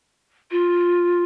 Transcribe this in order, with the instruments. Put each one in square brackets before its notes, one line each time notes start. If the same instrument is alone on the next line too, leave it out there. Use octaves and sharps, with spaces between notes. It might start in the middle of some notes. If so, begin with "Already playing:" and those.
[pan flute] F4